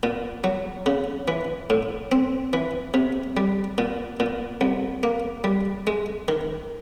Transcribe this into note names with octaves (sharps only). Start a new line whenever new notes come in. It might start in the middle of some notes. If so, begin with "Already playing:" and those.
A#2
F#3
C#3
E3
A2
C4
E3
C3
G3
A#2
A#2
C2
A#3
G3
G#3
D#3